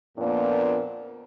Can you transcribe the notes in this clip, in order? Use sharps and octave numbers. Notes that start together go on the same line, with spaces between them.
F2 A#2 A#3 B3 D4